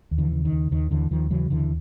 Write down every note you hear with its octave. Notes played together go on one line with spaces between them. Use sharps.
D#2
D3 E3
C#3
D#3
D#2
D#2 D#3
D#2 D3 E3
D#2 D#3 F3
C#3 E3 F#3
D#2 D3 E3